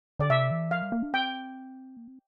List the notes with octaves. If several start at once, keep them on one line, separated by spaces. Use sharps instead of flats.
D3 D5
C3 E5
E3
F3 F5
G3
A#3
D4
C4 G5
A#3
C4